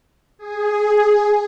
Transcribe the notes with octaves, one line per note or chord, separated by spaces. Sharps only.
G#4